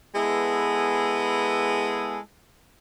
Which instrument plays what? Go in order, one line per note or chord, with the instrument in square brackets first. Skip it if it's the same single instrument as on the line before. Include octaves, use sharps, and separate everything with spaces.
[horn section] G#3 B3 E4 G#4 A4 B4